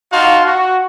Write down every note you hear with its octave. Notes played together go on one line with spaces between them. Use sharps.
D#4 F#4 F5 A5 C6
F#4